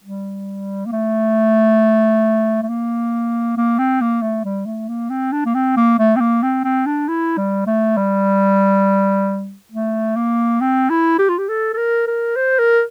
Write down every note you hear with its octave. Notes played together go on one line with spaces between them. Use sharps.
G3
A#3
A3
A3
A#3
A#3
C4
A#3
A3
G3
A3
A#3
C4
D4
A#3
C4
A#3
A3
C4
A#3
C4
C4
D4
E4
G3
A3
G3
A3
A#3
C4
E4
G4
F4
G4
A4
A4
A#4
A#4
C5
A#4